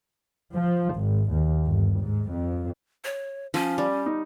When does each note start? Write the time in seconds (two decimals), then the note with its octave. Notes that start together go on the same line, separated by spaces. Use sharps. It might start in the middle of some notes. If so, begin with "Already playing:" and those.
0.54 F3
0.96 G#1
1.31 D#2
1.66 G1
2.00 G#2
2.31 F2
3.04 C#5
3.54 F3 C#4
3.78 G3 D5
4.06 D#4